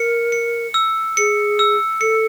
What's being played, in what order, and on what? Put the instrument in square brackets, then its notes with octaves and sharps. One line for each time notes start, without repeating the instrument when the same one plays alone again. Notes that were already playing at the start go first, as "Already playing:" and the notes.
Already playing: [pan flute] A#4 [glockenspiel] C#7
[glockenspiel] C#7
E6
[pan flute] G#4 [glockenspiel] C#7
[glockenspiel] E6
[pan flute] A4 [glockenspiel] C#7